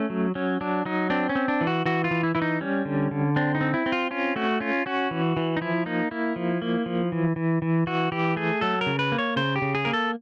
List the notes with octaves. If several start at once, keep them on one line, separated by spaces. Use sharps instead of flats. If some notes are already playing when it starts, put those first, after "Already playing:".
Already playing: A3 C#4
F#3
F#3 C#4
F#3 D4
F#3 D#4
C4 D4
C#4
C4
D4
E3
F#4
E3 F#4
F4
E3
E4
E3 E4
D#4
G3 C#4
D3
D3
C4 D4
D#4
C4
E4
C4
F4
C#4 F4
A3 F#4
C#4 F4
C#4 F#4
E3
E3
D#4
F3 E4
A#3 D#4
A#3 E4
F3
A#3
F3
E3
E3
E3
E3 F#4
E3 G4
A3 G#4
F#3 A4
A#4
C#3
B4
A#3
C#5
C#3 C5
G4
C#3
G#4
A#3 A#4
A4